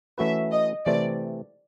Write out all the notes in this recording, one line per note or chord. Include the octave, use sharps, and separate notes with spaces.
E3 A3 C#4 F#4 B4 E5
D#5
C3 E3 A3 C4 D5